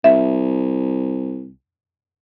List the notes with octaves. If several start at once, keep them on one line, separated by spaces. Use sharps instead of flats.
C2 E5